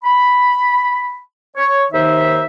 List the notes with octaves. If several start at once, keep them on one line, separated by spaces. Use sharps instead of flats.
B5
C#5
D#2 D#3 D#4 C5 E5